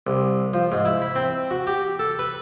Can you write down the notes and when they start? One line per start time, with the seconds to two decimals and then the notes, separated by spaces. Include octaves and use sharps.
0.07 C2
0.54 F3
0.72 G#2
0.85 E4
1.02 B5
1.15 C4
1.51 F#4
1.67 G4
1.99 A4
2.19 B4